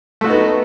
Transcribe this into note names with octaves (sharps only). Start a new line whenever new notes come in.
A3 B3 D#4 F#4